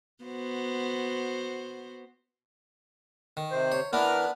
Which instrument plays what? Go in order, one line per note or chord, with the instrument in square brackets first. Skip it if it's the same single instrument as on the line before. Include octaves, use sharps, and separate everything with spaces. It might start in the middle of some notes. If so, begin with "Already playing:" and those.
[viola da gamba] B3 F#4 C5
[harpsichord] D#3
[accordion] C3 C5
[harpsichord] C#5
[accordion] E3 A#4 F6 [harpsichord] B3 D4 E4